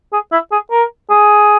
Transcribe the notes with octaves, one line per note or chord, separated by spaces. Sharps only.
G#4
E4
G#4
A#4
G#4